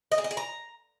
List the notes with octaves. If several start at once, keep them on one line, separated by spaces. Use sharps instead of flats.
D#5
G#4
D#5
G#4
A#5